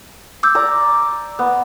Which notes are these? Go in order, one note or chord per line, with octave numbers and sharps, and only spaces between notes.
D6 E6 G6
D5 A#5
B3